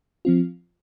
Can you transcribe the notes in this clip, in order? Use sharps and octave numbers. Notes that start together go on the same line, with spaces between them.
F3 C4 F4